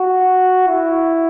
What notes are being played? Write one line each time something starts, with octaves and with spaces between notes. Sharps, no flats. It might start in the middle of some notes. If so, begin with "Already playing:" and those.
Already playing: F#4
E4